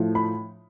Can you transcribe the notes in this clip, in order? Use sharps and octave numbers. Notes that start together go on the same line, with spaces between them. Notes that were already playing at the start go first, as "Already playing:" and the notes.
Already playing: A2 F3 A3
B5